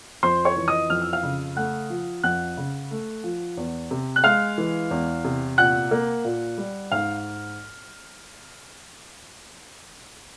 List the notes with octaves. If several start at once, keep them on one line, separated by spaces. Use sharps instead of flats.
F2 C5 C6
C#5 C#6
E3
D#5 D#6
F2 F6
E6
F5 F6
C#3
A3 F#5 F#6
F3
F2 F#5 F#6
C#3
A3
F3
E2
C3
F#6
G#3 F5 F6
E3
E2
C3
A#2 F#5 F#6
A#3
A#2
G3
G#2 F5 F6